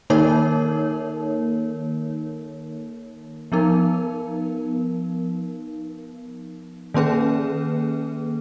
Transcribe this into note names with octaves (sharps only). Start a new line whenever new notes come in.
D#3 A#3 D#4 A#4 C#5
F3 B3 D#4 A#4
D#3 A#3 C#4 G#4 B4